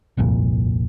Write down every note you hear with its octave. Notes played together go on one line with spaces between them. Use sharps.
G1 C2 F2 A#2